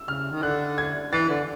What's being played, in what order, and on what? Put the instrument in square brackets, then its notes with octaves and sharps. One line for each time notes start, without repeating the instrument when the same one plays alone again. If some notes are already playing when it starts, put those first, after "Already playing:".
Already playing: [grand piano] E6
[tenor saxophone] C#3 [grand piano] F6
[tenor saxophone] D#3
[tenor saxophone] D3 [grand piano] F#6
[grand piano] G#6
[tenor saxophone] E3 [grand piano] A6
[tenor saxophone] D3